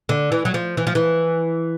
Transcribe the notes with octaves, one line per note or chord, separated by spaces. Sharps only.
D3
E3
F#3
F3
E3
F3
E3